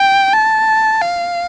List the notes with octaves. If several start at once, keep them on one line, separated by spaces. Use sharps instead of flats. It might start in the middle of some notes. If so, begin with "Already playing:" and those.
Already playing: G5
A5
F5